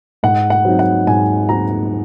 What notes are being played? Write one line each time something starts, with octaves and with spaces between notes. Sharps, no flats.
G#2 F#5
F#5
F#3 C4 D#4
F#5
G#2 G#5
F#3 C4 D#4 A#5